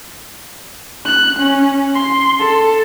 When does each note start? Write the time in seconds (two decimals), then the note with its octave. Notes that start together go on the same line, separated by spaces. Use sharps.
1.05 F#6
1.39 C#4
1.95 C6
2.39 A4